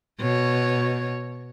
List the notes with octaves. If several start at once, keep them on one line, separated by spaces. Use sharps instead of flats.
B2 C#5